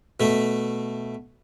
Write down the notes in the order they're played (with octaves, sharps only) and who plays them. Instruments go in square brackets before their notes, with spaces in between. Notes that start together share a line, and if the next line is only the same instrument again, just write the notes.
[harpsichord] B2 A3